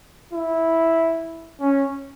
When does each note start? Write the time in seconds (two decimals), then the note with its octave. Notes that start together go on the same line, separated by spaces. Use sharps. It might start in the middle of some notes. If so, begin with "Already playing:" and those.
0.33 E4
1.61 C#4